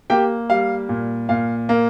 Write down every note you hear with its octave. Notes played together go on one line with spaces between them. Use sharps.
A#3 G4 G5
G3 F5
A#2
A#2 F5
A#3